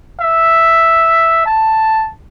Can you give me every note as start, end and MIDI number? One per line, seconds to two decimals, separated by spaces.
0.20 1.45 76
1.46 2.11 81